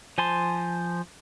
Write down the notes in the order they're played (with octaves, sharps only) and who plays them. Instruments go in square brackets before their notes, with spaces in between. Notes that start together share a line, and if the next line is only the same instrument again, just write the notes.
[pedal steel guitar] F3 C5 G#5 A5 C6